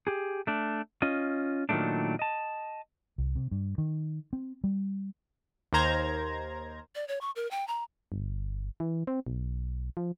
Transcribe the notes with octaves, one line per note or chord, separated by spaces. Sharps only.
G4 G#4
A3 D4
C#4 F4 D#5
A#2 D#3 F#3 G#3 A3 D4
D#5 A5
C2
C3
G2
D#3
C4
G3
D#2 D#4 A#4 C5 A#5 G#6
D5
C#5
C#6
A#4
G5
A#5
G1
E3
C4
B1
F3